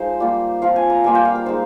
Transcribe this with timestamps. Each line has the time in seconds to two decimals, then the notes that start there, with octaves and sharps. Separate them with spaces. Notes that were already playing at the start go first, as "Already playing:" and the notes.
Already playing: F3 G#3 D#4 C5
0.20 G3 A#3 F4
0.62 F3 C4 F4 F5
0.76 G#5
0.90 A#5
1.04 G3 A#3 F4 G#5
1.15 G5
1.25 F5
1.35 A#4
1.46 G#3 D#4 C5